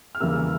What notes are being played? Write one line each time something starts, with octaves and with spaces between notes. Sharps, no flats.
F6
E2 C#3 E3 G3 A#3 E6